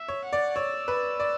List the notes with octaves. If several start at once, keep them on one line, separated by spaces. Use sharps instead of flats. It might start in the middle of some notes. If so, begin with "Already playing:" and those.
Already playing: E5
C#5
F#5
D5
C#5 E6
B4
D5